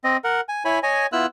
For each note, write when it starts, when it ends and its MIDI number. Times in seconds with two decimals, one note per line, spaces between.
0.04 0.17 60
0.04 0.17 75
0.24 0.41 70
0.24 0.41 78
0.49 0.65 80
0.65 0.79 64
0.65 0.79 73
0.65 0.79 80
0.65 0.79 83
0.83 1.06 73
0.83 1.06 75
0.83 1.06 80
1.12 1.26 59
1.12 1.26 64
1.12 1.26 65
1.12 1.26 88
1.12 1.26 90